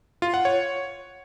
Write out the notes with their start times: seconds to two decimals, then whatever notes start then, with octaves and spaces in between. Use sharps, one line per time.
0.22 F4
0.34 F#5
0.45 C#5